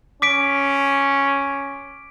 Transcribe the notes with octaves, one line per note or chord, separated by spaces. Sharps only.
C#4 D6 B6 D7